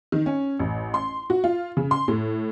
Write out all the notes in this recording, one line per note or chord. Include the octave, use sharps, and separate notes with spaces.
D#3
C#4
A1
C6
F#4
F4
C#3
C6
A2